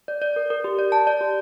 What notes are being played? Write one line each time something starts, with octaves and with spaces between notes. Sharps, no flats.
D5
D5
A#4
A#4
G4
D5
A5
D5
G4